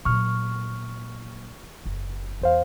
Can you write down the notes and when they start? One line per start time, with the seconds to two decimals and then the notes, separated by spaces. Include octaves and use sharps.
0.05 A#2 F#3 C#6 F6
1.86 F#1
2.42 E2 C5 F5